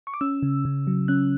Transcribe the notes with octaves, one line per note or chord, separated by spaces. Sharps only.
C#6
D6
C#4 E6
C#3
C#3
F#3
C#4 F#6